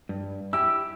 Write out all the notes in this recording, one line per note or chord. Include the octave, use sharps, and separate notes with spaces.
G2
E4 G4 E6